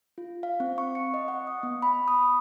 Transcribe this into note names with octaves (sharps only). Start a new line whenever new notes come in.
F4
F5
C4
C#6
C#7
D#5
F#5
D#6
B3
B5
D#6